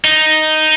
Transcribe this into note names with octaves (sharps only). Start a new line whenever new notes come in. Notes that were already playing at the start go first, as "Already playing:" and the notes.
D#4